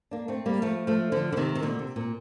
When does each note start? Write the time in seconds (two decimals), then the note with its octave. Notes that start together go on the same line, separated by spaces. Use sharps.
0.11 A#3 D4
0.28 A3 C4
0.46 G3 A#3
0.62 F3 A3
0.87 F3 A3
1.12 D3 F3
1.32 D3
1.37 C3 D#3
1.55 C3
1.62 A#2 D3
1.79 C3
1.96 A#2